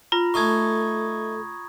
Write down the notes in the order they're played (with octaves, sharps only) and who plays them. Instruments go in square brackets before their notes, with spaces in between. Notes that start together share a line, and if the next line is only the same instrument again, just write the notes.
[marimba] F4 [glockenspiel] A#5 B5 A#6
[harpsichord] A3 D#4 C6 [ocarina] A4 [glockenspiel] C#6 D#6 G#6